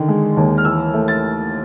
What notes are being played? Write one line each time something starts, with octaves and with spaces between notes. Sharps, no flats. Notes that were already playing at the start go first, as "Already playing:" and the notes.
Already playing: D3 D#3
G#3
D#2
F6
E3 E6
A3
A6